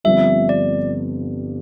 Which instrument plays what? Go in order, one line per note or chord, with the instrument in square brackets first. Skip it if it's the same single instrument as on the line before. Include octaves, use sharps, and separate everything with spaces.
[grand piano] G1 G2 F3 C4 [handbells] E5
[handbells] D5